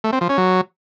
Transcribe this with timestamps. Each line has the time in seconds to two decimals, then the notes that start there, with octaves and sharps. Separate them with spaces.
0.04 A3
0.13 C4
0.21 F3
0.29 C#4
0.38 F#3